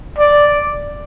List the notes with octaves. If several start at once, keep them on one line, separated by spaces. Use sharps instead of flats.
D5